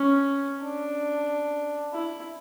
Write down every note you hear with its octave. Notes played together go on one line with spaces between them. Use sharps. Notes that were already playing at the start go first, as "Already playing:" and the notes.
Already playing: C#4
D4
E4